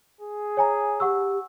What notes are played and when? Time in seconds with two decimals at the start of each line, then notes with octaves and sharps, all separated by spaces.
0.21 G#4
0.57 C#5 G#5 A#5
1.00 G4 F#5 C#6 E6